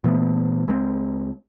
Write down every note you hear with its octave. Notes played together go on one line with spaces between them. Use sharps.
A#2 E3 A3 B3
C#2 G#3 A3 C4